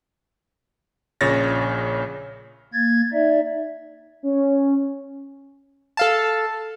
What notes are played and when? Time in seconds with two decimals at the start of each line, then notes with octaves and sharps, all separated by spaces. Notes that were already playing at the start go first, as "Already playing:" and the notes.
1.21 A#1 A#2 C#3 C#5 A6 A#6
2.73 A#3 G#6 A6
3.13 D#4 D5 E5
4.23 C#4
5.97 A4 F5 A5